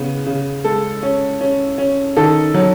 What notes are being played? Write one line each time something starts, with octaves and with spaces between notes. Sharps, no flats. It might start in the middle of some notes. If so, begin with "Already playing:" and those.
Already playing: C#3 B3
C#3
G#3 A4
C#4
C#4
C#4
D#3 A4
F#3